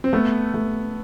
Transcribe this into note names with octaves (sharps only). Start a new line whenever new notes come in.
C4
A3 B3
A3